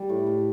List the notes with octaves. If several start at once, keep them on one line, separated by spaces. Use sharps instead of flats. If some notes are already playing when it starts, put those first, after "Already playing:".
Already playing: G3
A2
A2